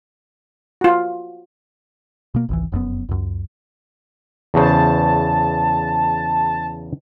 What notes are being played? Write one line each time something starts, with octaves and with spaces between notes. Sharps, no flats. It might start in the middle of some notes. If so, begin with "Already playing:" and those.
F4 F#4
B2 A#3
G#1 C#2 E3
F1 F#2 B2 B3
C#2 F#2
E2 C#3 C5 A5